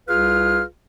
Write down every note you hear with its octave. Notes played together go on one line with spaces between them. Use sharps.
C2 F4 G#4 B4 F5 F6